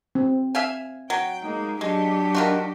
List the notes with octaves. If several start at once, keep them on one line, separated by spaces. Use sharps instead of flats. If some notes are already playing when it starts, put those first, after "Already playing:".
C4
E5 F5 G#5
F#3 G5
G#3 A#3 D#4
F#3 G#3 D4 G4
D#3 F4 F#4